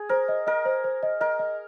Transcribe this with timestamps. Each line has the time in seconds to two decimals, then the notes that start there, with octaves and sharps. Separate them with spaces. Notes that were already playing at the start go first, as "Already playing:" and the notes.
Already playing: G#4
0.09 A#4 C5
0.28 D#5
0.47 A#4 D#5
0.65 C5
0.84 C5
1.03 D#5
1.21 A#4 D#5
1.39 D#5